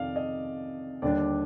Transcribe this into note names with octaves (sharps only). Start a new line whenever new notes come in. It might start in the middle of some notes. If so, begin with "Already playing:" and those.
Already playing: F2 C3 D#3 D5 F5
D#5
D#2 D3 G3 D4 D5